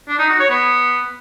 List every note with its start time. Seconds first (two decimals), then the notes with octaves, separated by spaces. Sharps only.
0.08 D4
0.19 D#4
0.29 F#4
0.39 C#5
0.50 B3